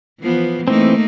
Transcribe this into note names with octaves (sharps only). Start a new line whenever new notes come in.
E3 F3 B3
E3 A3 A#3 C4 D#4